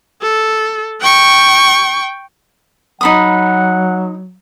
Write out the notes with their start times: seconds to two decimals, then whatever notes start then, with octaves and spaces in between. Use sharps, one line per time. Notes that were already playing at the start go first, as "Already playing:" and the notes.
0.22 A4
1.01 G5 C#6
3.01 F#3 D#4 F#5 B5 D#6